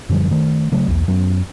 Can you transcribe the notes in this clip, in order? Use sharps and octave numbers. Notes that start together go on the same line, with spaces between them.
F#2 D3 F3 G3
D#3 A3
C#3 F#3 A3
B1 E2
F#2 F#3 B3 C#4